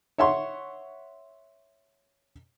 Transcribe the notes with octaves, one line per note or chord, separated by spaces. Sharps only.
C#5 E5 F#5 C6 C#6